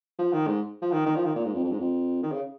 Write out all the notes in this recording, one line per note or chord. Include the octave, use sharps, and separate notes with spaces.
F3
D#3
G#2
F3
D#3
D#3
F3
D#3
A#2
G#2
F2
F2
G#2
F2
D#3
C#3